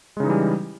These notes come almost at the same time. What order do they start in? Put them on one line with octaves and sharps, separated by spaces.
G#3 C#3 D#4 E3 G3